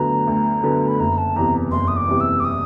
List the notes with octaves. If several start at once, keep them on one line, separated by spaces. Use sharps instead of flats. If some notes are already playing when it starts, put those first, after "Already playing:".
Already playing: D2 D3 F#3 B3 A#5
D2
D3 F#3 B3
B5
F#1 A#5
A5
E2 C3 A#5
F#1 C6
D#6
D6
E2 C3
E6
D6
D#6